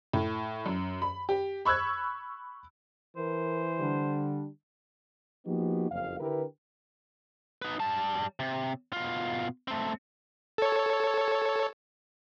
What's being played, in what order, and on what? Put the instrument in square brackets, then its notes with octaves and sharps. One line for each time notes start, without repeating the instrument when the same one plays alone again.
[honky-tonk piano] A2
F#2
B5
G4
B5 C#6 E6 F#6 G#6
[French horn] E3 [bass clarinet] A#4 [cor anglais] C5
[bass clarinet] D3 [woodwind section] G3 D4
[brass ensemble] F3 A#3 B3 D#4 F#4 G4
F#1 F2 F5
D3 D4 E4 G4 A#4 B4
[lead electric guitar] D#4 B4
G3 A5
C3
B2 F4
A3 C4
[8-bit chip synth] A4 C#5